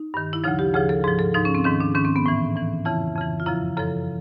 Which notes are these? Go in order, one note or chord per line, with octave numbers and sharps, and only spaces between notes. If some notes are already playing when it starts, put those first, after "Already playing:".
Already playing: D#4
G2 D#3
E4
D2 C#3 F3 D#4
G4
D2 C#3 F3 G#4
A4
G#2 F3 G#4
A4
G#2 F3 D#4
C#4
C4
G#2 D#3 C#4
D4
G#2 D#3 C#4
C4
B3
A2 E3
A2 E3
F2 C#3 E3 E4
F2 C#3 E3
F4
F#2 C#3 F3 E4
F#2 C#3 F3 A4